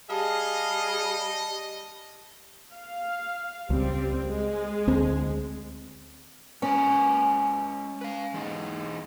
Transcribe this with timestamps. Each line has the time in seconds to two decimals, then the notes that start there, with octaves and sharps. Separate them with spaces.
0.10 G3 G#4 D#5 F5 A5
2.75 F5
3.70 C#2 G3 C4
4.28 G#3
4.88 D2 C4
6.62 G#3 C#4 B4 A#5
8.01 B4 F5
8.34 E2 G#3 D#4